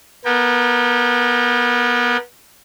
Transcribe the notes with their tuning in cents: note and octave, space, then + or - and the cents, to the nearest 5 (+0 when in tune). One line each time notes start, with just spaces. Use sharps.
B3 -25 A#4 -10 G5 +25